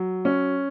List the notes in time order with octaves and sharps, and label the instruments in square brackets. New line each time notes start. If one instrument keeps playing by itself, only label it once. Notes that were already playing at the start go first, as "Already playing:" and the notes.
Already playing: [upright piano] F#3
C#4